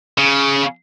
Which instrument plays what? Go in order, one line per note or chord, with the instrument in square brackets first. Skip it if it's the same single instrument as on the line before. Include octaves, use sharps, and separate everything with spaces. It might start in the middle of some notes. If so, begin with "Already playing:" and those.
[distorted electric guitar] C#3